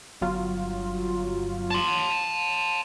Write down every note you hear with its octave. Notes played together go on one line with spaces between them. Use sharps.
G1 F#3 F4
A5 C6